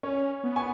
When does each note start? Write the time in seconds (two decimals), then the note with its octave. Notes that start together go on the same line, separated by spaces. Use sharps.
0.03 C#4 C#5
0.44 B3
0.56 G#5 C#6